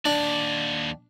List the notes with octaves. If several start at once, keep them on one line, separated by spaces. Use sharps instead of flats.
D#2 D4 D5